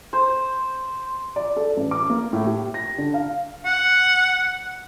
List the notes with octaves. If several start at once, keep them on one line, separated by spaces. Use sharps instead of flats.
C5
D5
A4
A1
D6
A#3
A2
G4
A#6
D3
F5
F#5